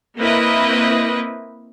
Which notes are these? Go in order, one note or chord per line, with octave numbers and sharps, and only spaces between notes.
A#3 C4 E4 B4 D#5